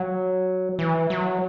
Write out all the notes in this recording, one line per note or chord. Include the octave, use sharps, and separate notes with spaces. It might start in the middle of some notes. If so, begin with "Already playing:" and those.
Already playing: F#3
E3
F#3